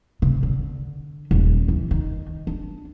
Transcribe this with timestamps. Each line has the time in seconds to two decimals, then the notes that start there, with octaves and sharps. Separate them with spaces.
0.22 C3
0.43 D3
1.31 D#1
1.68 E3
1.91 D#3
2.47 D4